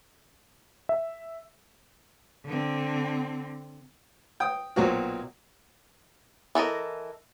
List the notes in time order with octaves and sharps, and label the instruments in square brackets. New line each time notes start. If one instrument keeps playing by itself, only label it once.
[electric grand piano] E5
[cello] D3 C4
[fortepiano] G5 D#6
B1 A#2 F#3 C4 F#4
[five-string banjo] E3 A4 A#4 D#5